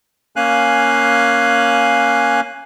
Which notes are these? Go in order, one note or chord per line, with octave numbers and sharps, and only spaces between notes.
A#3 C#4 F5 G#5 F#6